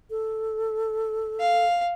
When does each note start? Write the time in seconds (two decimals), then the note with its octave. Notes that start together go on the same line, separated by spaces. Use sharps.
0.10 A4
1.40 F5